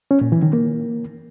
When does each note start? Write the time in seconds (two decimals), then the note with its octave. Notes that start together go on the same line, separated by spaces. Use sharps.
0.11 C#4
0.21 A#2
0.32 E3
0.43 D#3
0.53 A#3